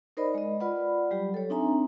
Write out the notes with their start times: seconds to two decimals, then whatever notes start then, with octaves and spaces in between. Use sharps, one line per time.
0.17 D#4 A#4 C5 D5 D#5 B5
0.34 G#3 D#5
0.60 F4 B4 D5 F#5 B5
1.11 F#3 G3 G4 G5
1.34 A4 C#5
1.50 C4 D4 D#4 E5 G#5 A#5